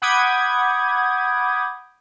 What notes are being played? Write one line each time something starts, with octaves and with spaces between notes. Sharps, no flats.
F#5 B5 D6 D#6 G6 G#6